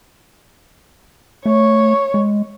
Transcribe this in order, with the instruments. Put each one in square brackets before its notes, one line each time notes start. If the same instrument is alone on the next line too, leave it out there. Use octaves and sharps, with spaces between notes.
[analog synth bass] A3 [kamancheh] C#5
[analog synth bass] G#3